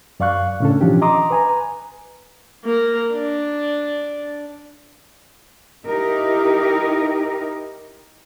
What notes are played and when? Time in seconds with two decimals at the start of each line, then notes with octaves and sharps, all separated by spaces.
0.20 F#2 D5 F5 C#6 F#6
0.60 A2 C#3 C#4 D4 A4
0.81 B2 E3 F3 C#4 D4 G4
1.02 D#5 A#5 C6 D6 D#6
1.30 B4 G#5 A#5
2.65 A#3 A#4
3.13 D4
5.86 D#4 E4 G4 A#4